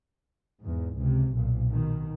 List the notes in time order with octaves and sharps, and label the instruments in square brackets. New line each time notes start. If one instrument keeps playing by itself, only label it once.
[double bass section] E2 G#2
C#2 C3
B1 A#2
B2 D#3